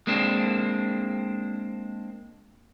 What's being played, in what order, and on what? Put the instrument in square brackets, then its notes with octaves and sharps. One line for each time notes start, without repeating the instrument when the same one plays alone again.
[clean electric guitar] G#3 A#3 C4 D4